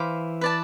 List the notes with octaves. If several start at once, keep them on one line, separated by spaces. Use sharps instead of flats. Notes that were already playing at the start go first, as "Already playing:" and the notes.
Already playing: E3 C5 F5 B5 D6
B4 D5 A5